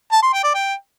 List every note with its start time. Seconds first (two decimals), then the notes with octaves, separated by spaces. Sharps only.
0.12 A5
0.23 C6
0.33 G5
0.44 D5
0.54 G5